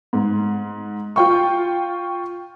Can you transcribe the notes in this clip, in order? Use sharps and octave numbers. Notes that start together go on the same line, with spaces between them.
G#2
F4 G5 C#6